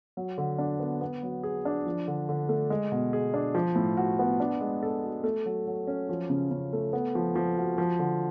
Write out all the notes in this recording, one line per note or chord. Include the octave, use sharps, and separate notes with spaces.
F#3
D3
D4
B3
B3
F#3
G#4
D4
F3
D3
D3
A3
G#3
B2
G#4
D4
F3
A2
F#4
B3
D4
G#3
A4
F#4
A3
F#3
F#3
C#4
F3
C#3
C#3
A3
B3
F3
F3
F#4
F3
D3